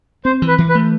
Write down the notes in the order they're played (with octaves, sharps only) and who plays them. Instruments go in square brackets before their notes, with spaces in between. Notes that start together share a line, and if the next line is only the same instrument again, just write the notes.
[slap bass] C4 [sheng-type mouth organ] C5
[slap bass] E3
[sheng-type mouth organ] B4
[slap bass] E3
[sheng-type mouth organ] B4
[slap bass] A3